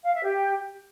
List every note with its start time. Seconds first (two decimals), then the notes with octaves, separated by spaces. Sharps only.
0.03 F5
0.13 E5
0.23 G4